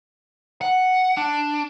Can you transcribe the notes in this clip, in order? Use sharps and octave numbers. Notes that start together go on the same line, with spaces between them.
F#5
D4